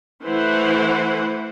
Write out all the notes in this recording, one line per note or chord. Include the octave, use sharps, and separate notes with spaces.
E3 A3 B4 C5 F#5